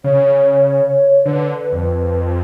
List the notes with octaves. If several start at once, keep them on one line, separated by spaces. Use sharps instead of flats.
C#3 C#5
D3 B4
F2